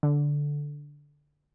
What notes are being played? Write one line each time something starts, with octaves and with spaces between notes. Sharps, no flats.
D3